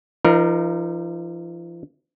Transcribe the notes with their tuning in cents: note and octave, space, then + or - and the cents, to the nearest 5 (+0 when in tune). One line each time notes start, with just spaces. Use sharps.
F3 -45 D#4 -30 A#4 +5